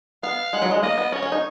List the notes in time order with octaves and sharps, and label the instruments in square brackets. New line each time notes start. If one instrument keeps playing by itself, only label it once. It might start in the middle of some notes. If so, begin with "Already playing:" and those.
[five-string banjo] B3 [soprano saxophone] F5
[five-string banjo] G#3 [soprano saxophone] F#5
[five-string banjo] F#3
G#3
[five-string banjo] A#3 [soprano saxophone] D#5
[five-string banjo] B3
[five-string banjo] C#4 [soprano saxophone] C#5
[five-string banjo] C#4
D#4